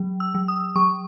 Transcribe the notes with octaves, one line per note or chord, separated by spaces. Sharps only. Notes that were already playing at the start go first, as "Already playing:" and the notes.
Already playing: F#3
E6
F#3
D#6
F#3 C#6